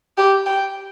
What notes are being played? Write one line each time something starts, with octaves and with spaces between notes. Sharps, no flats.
G4
G5